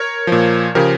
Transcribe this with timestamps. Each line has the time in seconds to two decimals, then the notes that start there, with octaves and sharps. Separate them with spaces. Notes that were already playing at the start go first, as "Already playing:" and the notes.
Already playing: A#4 C#5
0.27 A#2 F3
0.75 C#3 F3 G4 A#4